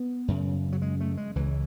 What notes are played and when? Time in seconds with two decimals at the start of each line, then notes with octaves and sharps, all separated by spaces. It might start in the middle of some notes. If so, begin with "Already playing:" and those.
Already playing: B3
0.28 F#2 C#3
0.72 F#3
0.82 G#3
1.00 A3
1.17 G#3
1.36 C#2 C#3 E3